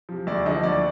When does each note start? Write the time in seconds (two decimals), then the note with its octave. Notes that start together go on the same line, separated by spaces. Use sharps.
0.09 C3 F3
0.27 D2 D5
0.46 D3 F3 D#5
0.63 D2 D5